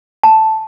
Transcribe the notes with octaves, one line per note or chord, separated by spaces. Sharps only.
A5